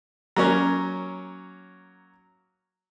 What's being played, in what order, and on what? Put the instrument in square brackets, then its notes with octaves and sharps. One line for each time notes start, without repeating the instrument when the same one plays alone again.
[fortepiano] F#3 A#3 C#4